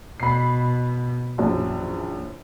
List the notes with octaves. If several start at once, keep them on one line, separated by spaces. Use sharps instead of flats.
B2 B5 C7
A#1 F#2 E3